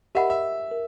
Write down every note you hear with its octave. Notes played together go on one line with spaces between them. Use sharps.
G4 A#4 D#5 E5 F#5 B5
E5
A#4